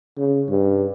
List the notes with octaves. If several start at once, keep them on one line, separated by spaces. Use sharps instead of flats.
C#3
G2